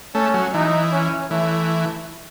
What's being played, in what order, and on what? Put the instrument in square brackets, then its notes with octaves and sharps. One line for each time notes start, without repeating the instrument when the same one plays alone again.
[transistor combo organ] A3 [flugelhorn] C#4
[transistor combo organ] F#3
[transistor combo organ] E3 [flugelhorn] D#4
[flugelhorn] C#4
[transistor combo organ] E3 [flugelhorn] A3